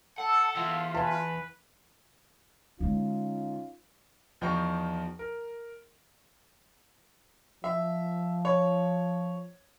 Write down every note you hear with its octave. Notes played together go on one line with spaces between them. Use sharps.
A4 F#5 A5 E6
E3 F4 E5 F#5 C6
B4 G#5 A5
D3 G#3 C#4 D#4 F4
E2 F3 D#4 G5 A#5 C#6
A#4
F3 E5
C#5